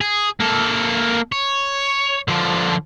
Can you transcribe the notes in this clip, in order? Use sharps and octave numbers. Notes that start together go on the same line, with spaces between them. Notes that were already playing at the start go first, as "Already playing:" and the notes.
G#4
A#3 A4
C#5
D3 F3